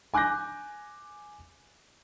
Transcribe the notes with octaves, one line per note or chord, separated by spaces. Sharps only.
G#5 D6 F#6 G6 A#6